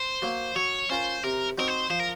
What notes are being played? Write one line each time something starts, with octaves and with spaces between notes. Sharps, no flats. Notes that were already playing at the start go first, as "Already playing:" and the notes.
Already playing: C5
F#3 A#3
F#3 C#5
C#4 F4 A#4 C5
C3 A#4
F#3 C4 D#4 A#4
C5
F3 C5
A#4